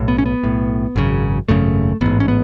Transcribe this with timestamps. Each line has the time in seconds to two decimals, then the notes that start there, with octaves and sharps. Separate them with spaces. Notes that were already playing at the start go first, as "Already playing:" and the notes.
Already playing: B1 A2
0.08 B3
0.18 C#4
0.26 B3
0.44 B1 A2
0.96 G#1 F#2 C#3
1.48 G#1 F#2 C#3 A3
2.01 A1 G#2 B3
2.20 C#4
2.28 B3